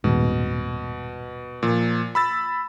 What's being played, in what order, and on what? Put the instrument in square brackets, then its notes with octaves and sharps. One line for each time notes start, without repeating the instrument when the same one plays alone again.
[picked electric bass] D#1 G#2 [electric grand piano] B2
[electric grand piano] A#2 F3
B5 E6 A6